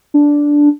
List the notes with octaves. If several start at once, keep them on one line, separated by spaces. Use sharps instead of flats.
D4